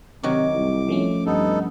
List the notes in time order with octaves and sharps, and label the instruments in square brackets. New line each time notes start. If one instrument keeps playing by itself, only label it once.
[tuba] C3 [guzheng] D#3 F#3 F#4 [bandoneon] D6
[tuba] C2
[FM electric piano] F3 A3 C#4
[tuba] G2 [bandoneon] B3 D#4 A4